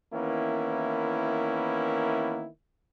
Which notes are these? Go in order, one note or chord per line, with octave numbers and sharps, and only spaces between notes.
D#3 E3 A#3 B3 C#4 E4